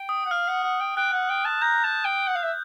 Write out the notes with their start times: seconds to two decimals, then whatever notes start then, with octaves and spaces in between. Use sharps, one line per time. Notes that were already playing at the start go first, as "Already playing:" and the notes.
Already playing: G5
0.09 D#6
0.26 F#5
0.31 F5 F6
0.48 F#5
0.63 F#5
0.81 G5
0.97 G5 F#6
1.13 F#5
1.30 G5
1.45 A5
1.62 A#5 G6
1.84 A5
2.05 G5
2.28 F#5
2.36 F5
2.43 E5